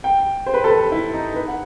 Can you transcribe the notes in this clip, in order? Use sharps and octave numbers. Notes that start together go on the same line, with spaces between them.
G5
C5
B4
A4
B4
E4
D#4
B4
F#5